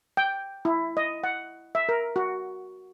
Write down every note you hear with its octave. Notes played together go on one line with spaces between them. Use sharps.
G5
E4
D#5
F#5
E5
A#4
F#4